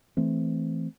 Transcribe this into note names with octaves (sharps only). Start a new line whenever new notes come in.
E3 A3 C4